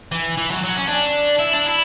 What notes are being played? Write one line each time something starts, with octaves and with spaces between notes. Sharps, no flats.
E3
E3
F#3
F#3
C#4
D4
E4
D4
E4